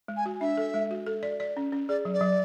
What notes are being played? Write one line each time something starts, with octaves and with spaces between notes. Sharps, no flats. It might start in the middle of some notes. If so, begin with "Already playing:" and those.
G#3
G#5
F#4
D4 E5
A4
G#3
F#4
A4
D5
D5
C#4
C#4
G#4 D5
F#3
D5
F#3